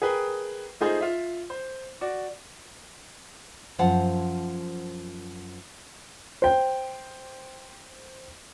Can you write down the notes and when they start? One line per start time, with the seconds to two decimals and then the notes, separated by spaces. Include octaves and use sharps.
0.02 G#4 A#4 B4 G5
0.81 A3 D#4 F4 G#4 C5 D#5
1.01 F4 E5
1.50 C5
2.01 F#4 D5
3.79 F#2 F3 C5 F5 F#5 A5
6.42 C5 G5